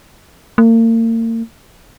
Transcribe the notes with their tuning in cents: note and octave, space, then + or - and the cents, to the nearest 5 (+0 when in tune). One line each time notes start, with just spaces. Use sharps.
A#3 -40